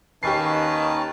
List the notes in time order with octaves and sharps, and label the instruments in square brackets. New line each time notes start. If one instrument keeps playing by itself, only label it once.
[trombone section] D#2 D#3 [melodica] C#4 B4 A5 [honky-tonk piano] G4 C#6 C7